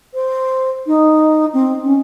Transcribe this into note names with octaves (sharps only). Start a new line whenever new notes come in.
C5
D#4
C4
C#4